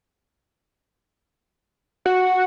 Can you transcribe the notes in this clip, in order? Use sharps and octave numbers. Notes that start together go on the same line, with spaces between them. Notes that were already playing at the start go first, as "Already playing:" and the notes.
F#4 F#5